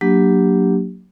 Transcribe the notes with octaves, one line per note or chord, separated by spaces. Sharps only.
F#3 A#3 D4 G4